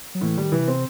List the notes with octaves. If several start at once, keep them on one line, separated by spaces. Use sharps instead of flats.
F#3
A2 E3
D#3 G3
C3 E3
C4